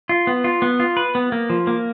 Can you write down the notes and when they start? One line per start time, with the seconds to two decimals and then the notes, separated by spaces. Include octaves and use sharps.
0.09 F4
0.27 B3
0.44 F4
0.62 B3
0.80 F4
0.97 B4
1.15 B3
1.32 A#3
1.50 F3
1.67 A#3